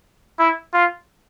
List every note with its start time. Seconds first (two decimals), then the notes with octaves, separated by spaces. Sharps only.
0.39 E4
0.74 F4